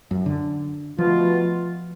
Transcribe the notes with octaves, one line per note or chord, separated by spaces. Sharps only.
F#2
D3
B2 F3 A3 F4